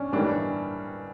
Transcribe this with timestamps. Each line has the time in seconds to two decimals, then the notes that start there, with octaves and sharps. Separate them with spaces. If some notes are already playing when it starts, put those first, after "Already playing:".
Already playing: C#4 D4
0.12 G2 E3 G3 A#3 D4 D#4